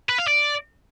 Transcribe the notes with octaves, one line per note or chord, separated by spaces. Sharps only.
B4
F5
D5